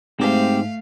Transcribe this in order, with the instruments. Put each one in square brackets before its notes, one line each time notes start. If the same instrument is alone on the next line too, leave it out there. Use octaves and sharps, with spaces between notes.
[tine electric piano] G#2 [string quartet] A3 F5 [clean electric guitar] C4 G4